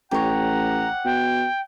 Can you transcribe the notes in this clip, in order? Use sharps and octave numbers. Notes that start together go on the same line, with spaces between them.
A1 G4 C#5 F#5 A#5
B2 G5